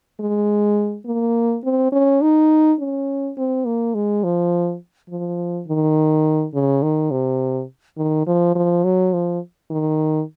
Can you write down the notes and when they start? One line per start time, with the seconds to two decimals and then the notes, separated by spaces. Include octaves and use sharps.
0.20 G#3
1.06 A#3
1.64 C4
1.92 C#4
2.21 D#4
2.80 C#4
3.37 C4
3.66 A#3
3.94 G#3
4.24 F3
5.09 F3
5.68 D#3
6.54 C#3
6.82 D#3
7.11 C3
7.97 D#3
8.27 F3
8.55 F3
8.84 F#3
9.13 F3
9.70 D#3